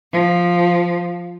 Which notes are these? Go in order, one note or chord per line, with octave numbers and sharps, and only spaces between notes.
F3